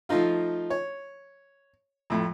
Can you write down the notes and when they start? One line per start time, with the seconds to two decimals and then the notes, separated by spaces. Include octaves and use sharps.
0.09 F3 A3 D#4 F4
0.70 C#5
2.10 F2 A2